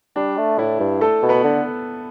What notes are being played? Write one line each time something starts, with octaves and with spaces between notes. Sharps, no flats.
G3 D4
A3
A2 E4
G2
A3 A4
B2
B3 B4
D3